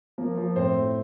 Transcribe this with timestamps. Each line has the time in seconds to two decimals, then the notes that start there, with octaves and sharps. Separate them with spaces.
0.18 F3 A#3 A#4
0.37 F3
0.56 A2 C4 C5
0.75 A2